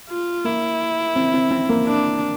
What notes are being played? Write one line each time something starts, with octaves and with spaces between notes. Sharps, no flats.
F4
A#3 E4
C4
C4
C4
A#3
D4